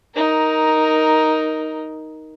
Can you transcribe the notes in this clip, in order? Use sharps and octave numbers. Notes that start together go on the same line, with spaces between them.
D#4 A#4